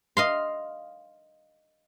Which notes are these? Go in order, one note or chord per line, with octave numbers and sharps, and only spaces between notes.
D#5 F5 C6